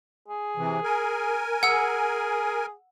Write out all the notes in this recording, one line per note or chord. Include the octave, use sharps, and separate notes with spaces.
G#4
C3 E3
A#4 G#5
G#4 F#5 E6